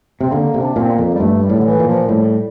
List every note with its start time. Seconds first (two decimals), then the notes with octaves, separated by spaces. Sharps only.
0.21 C3 C4
0.32 D3 A#3
0.54 C3
0.62 D4
0.76 A#2 C4
0.91 A#3
0.98 F2
1.15 G3
1.20 G2 A3
1.43 G3
1.49 A2
1.59 D3
1.65 E3
1.80 A#2
1.87 F3
2.09 A2 G3